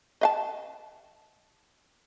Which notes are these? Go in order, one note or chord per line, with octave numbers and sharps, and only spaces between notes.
D#5 F5 A5